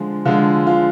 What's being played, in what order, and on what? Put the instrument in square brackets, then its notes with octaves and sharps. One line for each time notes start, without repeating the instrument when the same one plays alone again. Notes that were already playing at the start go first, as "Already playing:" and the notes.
Already playing: [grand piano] D3 F3 G#3 F4
D3 F3 G#3 F4
F4